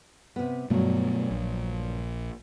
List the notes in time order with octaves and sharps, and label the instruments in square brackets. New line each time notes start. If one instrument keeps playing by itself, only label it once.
[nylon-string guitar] C3 B3
[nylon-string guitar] G2 F#3 [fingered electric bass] B2 A3 B3
[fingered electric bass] A#1